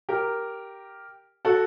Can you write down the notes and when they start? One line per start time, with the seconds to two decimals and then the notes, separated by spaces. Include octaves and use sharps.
0.09 G4 A#4
1.45 F#4 A4